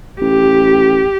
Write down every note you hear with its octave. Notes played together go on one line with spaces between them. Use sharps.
A1 G4